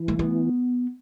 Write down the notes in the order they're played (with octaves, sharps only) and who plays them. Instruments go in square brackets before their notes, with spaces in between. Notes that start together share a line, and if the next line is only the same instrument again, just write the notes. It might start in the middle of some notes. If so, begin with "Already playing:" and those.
Already playing: [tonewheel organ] E3
[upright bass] A3
B3